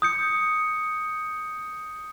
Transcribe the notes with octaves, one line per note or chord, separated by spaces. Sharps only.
D#6 G6 C#7